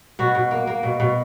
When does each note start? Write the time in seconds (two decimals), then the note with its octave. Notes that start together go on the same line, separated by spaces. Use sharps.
0.19 B2 F#4
0.35 B2
0.51 A#3
0.67 A#3
0.83 B2
1.00 B2